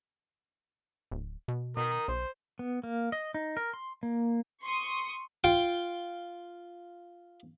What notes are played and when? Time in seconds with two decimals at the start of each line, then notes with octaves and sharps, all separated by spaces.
1.11 D1
1.48 B2
1.77 B2 A#4 D#6
2.08 B1 C5
2.59 B3
2.84 A#3
3.12 D#5
3.34 D#4
3.57 A#4
3.74 C6
4.03 A#3
4.63 C6 C#6 D#6
5.44 F4 G5